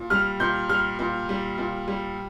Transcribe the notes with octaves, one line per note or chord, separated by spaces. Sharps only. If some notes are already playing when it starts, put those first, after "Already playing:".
Already playing: A#2
G3 F6
A#2 G6
G3 F6
A#2
G3
A#2
G3